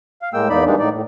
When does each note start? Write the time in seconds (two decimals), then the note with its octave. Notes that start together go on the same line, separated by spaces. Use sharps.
0.22 F5
0.33 A2 G#3 A#3 G5 E6
0.50 E2 A#3 D#4 D5 B5
0.65 E3 G3 G#3 A#3 D4 D#4
0.79 A2 D#4 D5
0.93 A2